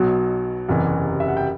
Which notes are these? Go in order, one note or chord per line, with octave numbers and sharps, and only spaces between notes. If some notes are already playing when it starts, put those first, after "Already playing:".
Already playing: B1 B2 F#3
F#1 E2 C3 E3
E5
F#5
G5